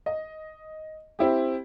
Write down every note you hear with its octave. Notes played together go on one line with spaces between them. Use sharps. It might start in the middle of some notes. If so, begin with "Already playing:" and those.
D#5
C4 E4 G4